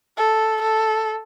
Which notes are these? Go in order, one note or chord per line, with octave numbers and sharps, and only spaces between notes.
A4
A4